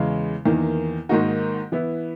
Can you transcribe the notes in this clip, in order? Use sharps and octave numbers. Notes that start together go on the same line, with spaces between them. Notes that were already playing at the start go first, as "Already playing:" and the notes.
Already playing: E2 C#3 G#3
E2 D#3 A#3
G#2 D#3 A#3 D#4 F#4
E3 B3 E4